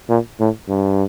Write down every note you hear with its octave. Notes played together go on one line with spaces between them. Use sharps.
A#2
A2
G2